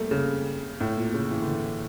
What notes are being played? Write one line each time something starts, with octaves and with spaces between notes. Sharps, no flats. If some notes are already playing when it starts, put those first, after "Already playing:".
Already playing: G3 A3 A#3
C#3
A2
A#2
C#3
E3
D3
E3